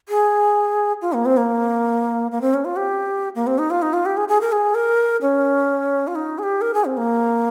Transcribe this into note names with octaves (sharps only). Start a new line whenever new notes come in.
G#4
F4
A#3
C4
A#3
A#3
C4
C#4
F4
G4
A#3
C4
D#4
F4
D#4
F4
G4
G#4
G#4
A#4
G#4
A#4
C#4
F4
D#4
G#4
G4
A#4
G#4
C4
A#3